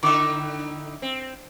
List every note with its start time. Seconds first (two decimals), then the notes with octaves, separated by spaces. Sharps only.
0.03 D3 D#4 E4 E5 D6
1.02 C4